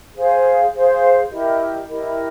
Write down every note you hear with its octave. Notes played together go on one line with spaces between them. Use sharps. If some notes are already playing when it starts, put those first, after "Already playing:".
G#4 C5 F5
G#4 C5 F5
E4 G4 A#4 D#5
E4 G4 A#4 D#5